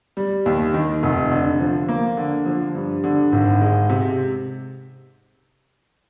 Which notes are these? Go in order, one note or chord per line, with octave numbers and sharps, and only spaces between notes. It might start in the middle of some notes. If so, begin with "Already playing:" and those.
G3
D#2
D#3
F1
D3
F3
A#3
D3
F3
G2
D3
G#1
G#3
C3